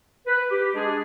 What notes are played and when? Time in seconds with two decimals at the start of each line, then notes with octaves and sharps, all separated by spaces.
0.26 B4
0.50 G4
0.74 G#3 D4 G#4